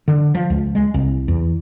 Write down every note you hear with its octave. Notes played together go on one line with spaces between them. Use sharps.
D3
F3
C#2
G#3
C2
E2